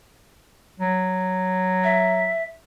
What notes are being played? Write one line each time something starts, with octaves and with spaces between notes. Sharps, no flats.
F#3
E5